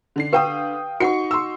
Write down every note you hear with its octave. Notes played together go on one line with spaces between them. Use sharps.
D3 D4 C7
G4 B4 F5 G5 D#6
D#4 F#4 F#5 C#6 C#7
C6 E6